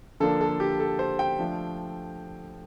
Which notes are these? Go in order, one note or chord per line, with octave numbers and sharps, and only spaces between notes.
D3 F3 A#3 D4 A4
A4
G4
A4
C5
G5
F3 A3 D4